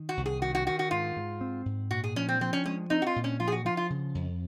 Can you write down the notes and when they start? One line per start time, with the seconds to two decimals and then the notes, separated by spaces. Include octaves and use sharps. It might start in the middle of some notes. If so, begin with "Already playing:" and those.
Already playing: D#3
0.09 F#4
0.17 C2
0.26 G#4
0.41 D#3 F#4
0.55 F#4
0.67 D#3 F#4
0.79 F#4
0.91 G#2 F4
1.16 G#2
1.41 C4
1.65 G#2
1.91 A#2 F#4
2.04 G#4
2.16 F3 C#4
2.29 C4
2.41 F3 C4
2.53 C#4
2.66 G#3 C#4
2.90 C4 D#4
3.02 F#4
3.07 F4
3.16 A#2
3.24 C#4
3.40 F3 F4
3.48 G#4
3.52 F#4
3.65 F3 F4
3.77 F4
3.90 C#3
4.15 F2